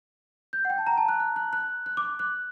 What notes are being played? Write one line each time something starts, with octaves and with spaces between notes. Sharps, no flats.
G6
F#5
G5
A5
A#5
A5
F#6
F#6
F#6
F#6
F#6
D6
F#6